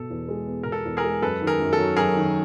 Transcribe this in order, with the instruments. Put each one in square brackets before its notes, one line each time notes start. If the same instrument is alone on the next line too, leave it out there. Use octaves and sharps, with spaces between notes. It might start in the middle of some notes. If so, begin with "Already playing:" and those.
Already playing: [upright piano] B2 B3 [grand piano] A4
[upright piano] E2
G#3
B3
[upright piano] B2 [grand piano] A#4
[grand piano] A4
[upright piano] E2
[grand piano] G#4 A#4
[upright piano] G#3
[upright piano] F#2 [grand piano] A4 B4
[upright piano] D#3
[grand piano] G#4 A#4
[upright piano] F#2
[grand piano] A4
[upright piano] F#3
[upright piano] F#2 [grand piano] G#4 A#4
[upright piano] D#3